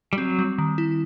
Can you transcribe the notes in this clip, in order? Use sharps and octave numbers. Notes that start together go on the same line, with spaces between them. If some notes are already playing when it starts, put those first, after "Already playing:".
G3
F#3 C4
G3
D#3
E4